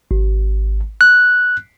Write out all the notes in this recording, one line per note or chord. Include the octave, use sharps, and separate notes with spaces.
G#1
F#6